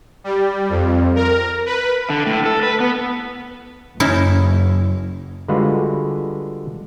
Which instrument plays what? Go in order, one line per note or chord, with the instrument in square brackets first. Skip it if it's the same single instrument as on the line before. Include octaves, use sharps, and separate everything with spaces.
[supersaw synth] G3
F2
A#4
B4
[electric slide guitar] D3
A2
A4
B4
B3
[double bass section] F#1 [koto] C#4 D#4 E4
[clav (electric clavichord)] D3 G3 G#3 F4 F#4 B4